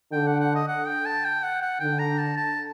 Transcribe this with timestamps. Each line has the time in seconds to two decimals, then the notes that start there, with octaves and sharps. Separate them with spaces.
0.12 D3 G5
0.27 F#5
0.40 F#5
0.55 D#5
0.68 F#5
0.86 G5
1.06 A5
1.25 G5
1.43 F#5
1.62 F#5
1.80 D3 G5
1.99 A#5
2.18 A5
2.37 A5